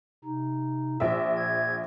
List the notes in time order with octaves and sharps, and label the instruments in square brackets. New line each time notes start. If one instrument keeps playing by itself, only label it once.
[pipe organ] C3 D#4
[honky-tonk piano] A#1 E5
[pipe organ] G#6